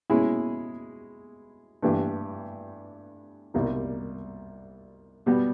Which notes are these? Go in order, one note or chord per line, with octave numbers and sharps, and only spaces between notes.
B2 G#3 C#4 E4 G#4
G2 E3 A3 D4 G4
C2 B2 G3 A#3 D#4
B2 G3 B3